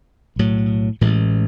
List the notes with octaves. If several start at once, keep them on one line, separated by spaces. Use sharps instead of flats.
B1 A2 F#3
A1 A2 E3 G#3